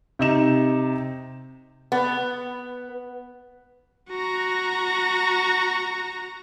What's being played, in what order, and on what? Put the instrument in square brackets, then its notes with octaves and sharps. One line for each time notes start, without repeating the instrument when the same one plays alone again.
[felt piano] C3 D#4 E7
[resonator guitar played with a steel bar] B3
[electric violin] F#4 A#5